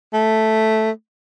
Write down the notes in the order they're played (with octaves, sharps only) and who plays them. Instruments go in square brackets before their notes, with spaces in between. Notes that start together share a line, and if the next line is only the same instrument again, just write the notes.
[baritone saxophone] A3